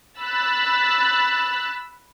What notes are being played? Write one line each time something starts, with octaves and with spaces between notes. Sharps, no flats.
B5 E6 F#6 A6